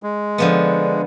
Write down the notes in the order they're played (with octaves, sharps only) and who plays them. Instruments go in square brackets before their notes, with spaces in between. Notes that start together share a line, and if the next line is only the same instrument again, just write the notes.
[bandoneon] G#3
[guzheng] D3 F3 B3